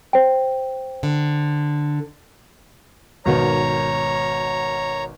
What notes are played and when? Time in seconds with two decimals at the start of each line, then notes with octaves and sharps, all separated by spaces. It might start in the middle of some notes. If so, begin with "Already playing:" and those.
0.13 C5 G5
1.03 D3
3.25 G#1 B2 D#3 C#5 A#5